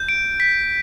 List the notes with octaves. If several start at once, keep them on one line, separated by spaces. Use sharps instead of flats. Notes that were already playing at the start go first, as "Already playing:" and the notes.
Already playing: G6
D7
B6